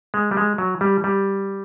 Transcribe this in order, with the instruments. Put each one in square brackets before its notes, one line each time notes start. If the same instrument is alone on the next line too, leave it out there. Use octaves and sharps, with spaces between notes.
[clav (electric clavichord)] G#3
G3
G#3
F#3
G3
G3